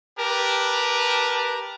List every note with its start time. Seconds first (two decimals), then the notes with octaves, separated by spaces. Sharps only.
0.19 G4 A#4 B4 A5